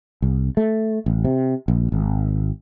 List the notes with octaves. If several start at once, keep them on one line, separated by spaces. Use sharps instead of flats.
C2
A3
A1
C3
A#1
G#1